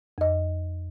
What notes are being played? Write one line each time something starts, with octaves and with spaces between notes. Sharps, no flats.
F2 D#5